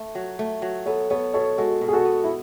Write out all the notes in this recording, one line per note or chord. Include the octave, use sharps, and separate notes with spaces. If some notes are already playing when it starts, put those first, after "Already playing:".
Already playing: A3
F#3
A3
F#3
B3 A4 C#5
B3 A4 C#5
B2 A4 C#5
G#3 F#4 A4
B2
G#4
F#4 A4
B3
E4